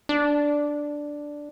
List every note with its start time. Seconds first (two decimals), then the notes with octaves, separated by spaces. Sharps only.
0.09 D4